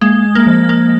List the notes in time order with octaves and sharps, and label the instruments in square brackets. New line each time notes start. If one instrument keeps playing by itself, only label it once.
[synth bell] G#3 [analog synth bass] A#3
[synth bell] A#3
[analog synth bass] F3
[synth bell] A#3